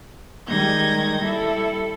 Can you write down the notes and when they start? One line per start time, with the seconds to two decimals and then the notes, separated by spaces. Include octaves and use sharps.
0.47 D#3 G3 G#3 G6 G#6 A#6
1.22 G3 E4 A4